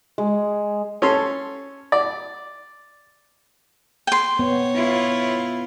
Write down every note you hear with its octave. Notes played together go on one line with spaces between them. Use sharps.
G#3
C#4 A4 C6
D5
G5 C6
B3 C#5
E4 F4